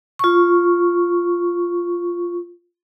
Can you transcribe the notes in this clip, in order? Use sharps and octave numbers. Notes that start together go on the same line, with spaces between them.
F4 C#6